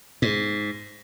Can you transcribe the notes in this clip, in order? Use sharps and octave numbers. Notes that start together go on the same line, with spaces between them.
G#2